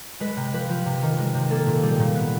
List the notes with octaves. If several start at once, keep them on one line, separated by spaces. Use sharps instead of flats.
G#3 B4
C3
F3 B4
F3
C3
D#3
G#3
C3
A#3 A4
A#2
G3 G#4
A#2
B3